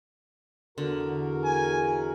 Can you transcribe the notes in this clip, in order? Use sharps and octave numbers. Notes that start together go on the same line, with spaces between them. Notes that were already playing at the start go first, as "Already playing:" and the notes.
E2 D3 F#4 A#4
G#5